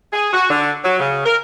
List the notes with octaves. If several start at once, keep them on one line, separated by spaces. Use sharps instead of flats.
G#4
F#4
D3
F#3
C#3
A#4